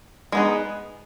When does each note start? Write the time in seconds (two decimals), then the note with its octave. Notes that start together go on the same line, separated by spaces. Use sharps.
0.32 G#3 B3 D#4